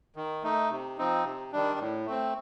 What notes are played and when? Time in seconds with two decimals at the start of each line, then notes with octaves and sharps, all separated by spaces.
0.16 D#3
0.43 A3 D#4
0.70 C3
0.98 F3 C4 D#4
1.24 C3
1.52 D#3 G3 D4
1.79 A2
2.06 A3 C4